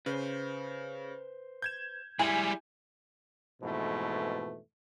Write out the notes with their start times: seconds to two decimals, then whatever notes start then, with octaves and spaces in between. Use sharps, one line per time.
0.06 C#3 B4 C5
1.62 G6 G#6 E7
2.19 G3 G#3 E4 G#5
3.62 F2 G#2 B2 E3 A3